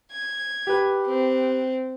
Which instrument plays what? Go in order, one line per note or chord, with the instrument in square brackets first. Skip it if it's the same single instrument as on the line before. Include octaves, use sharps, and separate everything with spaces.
[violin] G#6
[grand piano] G4 B4
[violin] C4